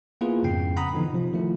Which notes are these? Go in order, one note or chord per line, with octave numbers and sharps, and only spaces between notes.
A#3 B3 E4 F4 G#4 B4
F2 G#2 C#3 G5 C7
F#5 A#5 B5 D#6
D3 E3 F3 B3 D#4
C3 F3
D#3 F3 A3 E4